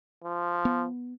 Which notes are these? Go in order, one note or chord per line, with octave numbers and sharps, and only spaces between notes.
F3
B3